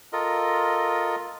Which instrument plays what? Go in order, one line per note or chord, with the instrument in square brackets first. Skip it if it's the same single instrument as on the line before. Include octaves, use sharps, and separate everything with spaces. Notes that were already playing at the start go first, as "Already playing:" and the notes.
[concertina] F4 A4 A#4 D#5